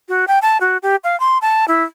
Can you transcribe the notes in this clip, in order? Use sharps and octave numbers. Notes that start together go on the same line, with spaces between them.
F#4
G5
A5
F#4
G4
F5
C6
A5
E4